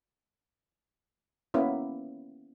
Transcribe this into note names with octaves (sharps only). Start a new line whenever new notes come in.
A#3 B3 C#4 E4